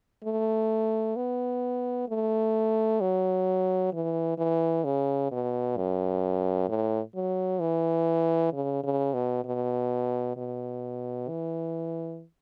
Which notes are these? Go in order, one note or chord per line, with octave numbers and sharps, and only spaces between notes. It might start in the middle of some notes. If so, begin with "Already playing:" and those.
A3
B3
A3
F#3
E3
E3
C#3
B2
F#2
A2
F#3
E3
C#3
C#3
B2
B2
B2
E3